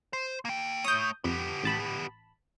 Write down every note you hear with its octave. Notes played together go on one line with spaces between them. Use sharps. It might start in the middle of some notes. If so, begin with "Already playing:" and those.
C5
A#3 G5
A3 C#5 D#6 G6
F2 B3 G4
A1 A5 B5